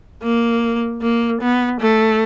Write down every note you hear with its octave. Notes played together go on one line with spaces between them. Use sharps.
A#3
A#3
B3
A3